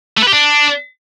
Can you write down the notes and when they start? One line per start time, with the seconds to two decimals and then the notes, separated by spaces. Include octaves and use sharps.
0.17 A3
0.22 B4
0.27 G4
0.33 D4